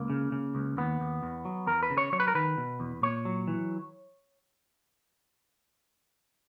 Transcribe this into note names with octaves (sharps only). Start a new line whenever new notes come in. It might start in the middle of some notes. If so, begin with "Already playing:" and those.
Already playing: C#2 A#3
C#3
C#3
C#2
D#2 B3
D#2
E2
F#3
E2 A#4
B4
C#3
C#5
F#3 C#5
B4
A#4
D#3 B4
B2
E2
A#2 C#5
F#3
E3